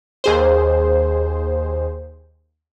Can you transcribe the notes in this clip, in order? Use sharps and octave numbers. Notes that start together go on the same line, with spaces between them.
D#2 G#4 C5